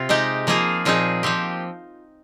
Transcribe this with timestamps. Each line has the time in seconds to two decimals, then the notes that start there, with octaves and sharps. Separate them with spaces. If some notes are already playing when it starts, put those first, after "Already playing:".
Already playing: C3 C4 F4
0.09 G#3 D#4 G4
0.47 F3 A#3 F4 G#4
0.85 A#2 F3 C4 D#4 G#4
1.23 F3 C4 G4